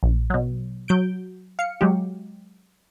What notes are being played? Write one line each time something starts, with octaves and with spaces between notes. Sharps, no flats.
A#1
B2 F#3
F#3 G6 D7
F5 C#7
F#3 G#3 G4